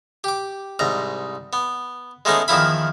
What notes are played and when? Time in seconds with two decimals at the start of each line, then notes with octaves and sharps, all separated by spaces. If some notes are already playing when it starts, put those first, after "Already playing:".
0.24 G4 D6
0.79 C2 G#2 A#5
1.53 B3
2.25 G#3 A3 B3 C#4 D#4 G#4
2.48 E2 D#3 F3 E4 B5